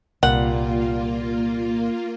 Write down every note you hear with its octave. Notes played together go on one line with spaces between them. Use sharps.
C2 A#2 G3 A#3 F4 F#5